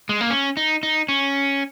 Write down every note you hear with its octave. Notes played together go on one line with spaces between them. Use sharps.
G#3
A#3
C#4
D#4
D#4
C#4